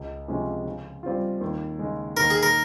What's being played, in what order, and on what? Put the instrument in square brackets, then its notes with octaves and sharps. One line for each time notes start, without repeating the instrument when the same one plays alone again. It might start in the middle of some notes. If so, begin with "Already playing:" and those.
Already playing: [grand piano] C#2
C3 F3 G#3 C#4
C#3
G3 C4 F4
D#2
C#3 G#3
[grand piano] D#2 [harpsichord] A#4
[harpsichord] G#4
A#4